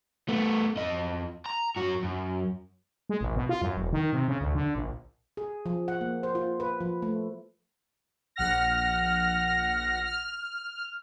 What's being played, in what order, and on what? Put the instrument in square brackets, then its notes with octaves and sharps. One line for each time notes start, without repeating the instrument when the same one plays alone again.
[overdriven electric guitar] A3 B3
F2 D#5
A#5
F#2 F#4
F#2
[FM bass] G#3
A#1
B2
F4
F#2
E1
D#3
C3
C#3
D2
D3
A#1
[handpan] G#4
F3
F#5
A#3
C5
F4
B4
F3
A3
[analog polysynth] A#1 F#5 F6 A#6
F6